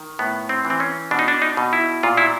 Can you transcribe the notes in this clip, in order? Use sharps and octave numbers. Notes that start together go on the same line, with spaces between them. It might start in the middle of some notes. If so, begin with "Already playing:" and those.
Already playing: D#3
A2 B3
C4
E3
C4
C#4
B2 D4
D#4
D4
D#4
B2
E4
A#2 F4
E4